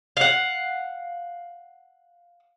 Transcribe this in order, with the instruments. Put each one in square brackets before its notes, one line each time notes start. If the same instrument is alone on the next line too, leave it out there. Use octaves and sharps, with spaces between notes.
[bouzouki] F5 F#5